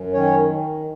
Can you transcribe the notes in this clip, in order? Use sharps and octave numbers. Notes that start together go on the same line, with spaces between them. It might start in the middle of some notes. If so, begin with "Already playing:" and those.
Already playing: F#2
D#3 C#4 C#5
D#3